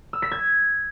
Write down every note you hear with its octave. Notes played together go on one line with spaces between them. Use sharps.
E6
B6
G#6